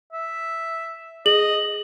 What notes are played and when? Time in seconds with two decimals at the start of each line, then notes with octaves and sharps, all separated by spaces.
0.13 E5
1.26 G#4 D#5 F#7